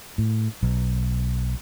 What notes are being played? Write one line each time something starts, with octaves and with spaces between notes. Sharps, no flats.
A2
B1